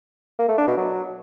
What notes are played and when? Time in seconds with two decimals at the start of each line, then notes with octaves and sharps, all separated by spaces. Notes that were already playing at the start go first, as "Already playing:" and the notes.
0.39 A#3
0.48 A3
0.58 D4
0.67 B2
0.77 F#3